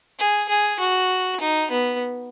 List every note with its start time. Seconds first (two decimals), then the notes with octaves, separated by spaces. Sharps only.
0.19 G#4
0.49 G#4
0.80 F#4
1.41 D#4
1.71 B3